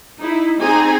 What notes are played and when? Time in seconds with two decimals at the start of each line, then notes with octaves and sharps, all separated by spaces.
0.21 D#4 E4
0.62 C4 D#4 G4 G#4 G#5 A#5